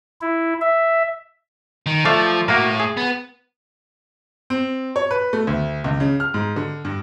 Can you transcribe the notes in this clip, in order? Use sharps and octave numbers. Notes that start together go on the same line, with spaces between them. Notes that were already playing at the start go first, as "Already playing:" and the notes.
E4
E5
D#3
F3 A3 D5 F5
A2 A#3 F#4 A#4
G#4
B3
C4
C#5
B4
A3
D2
C#2
C#3
F6
G#2
D3
G2